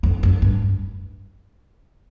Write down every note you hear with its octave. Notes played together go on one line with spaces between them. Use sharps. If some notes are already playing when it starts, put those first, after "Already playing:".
F2
F#2
G2